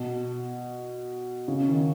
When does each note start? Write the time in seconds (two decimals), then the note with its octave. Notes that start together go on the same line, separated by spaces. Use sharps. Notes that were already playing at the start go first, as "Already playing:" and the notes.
Already playing: B2
1.48 C#3
1.67 D#3